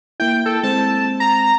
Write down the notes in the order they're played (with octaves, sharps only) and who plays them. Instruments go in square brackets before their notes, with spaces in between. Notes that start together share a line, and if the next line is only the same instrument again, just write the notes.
[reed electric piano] A#3 E4 [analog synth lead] G5
[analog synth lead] A4
[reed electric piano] G#3 C4 [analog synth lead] A5
[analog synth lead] A#5